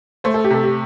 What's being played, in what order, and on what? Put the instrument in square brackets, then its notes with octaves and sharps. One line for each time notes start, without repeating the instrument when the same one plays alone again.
[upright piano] A3 [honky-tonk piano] C5
[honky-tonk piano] A4
G4
[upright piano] C3 [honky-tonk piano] A4
[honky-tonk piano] G4